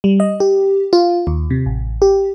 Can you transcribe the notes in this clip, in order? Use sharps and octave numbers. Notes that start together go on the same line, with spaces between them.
G3
D#5
G4
F4
D#2
C3
A1
G4